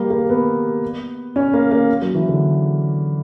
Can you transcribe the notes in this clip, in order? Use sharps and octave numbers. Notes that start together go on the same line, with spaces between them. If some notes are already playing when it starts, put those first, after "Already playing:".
Already playing: G3 A#3
A#3
B3
C#4
A#3
A#3
F#3
E3
D3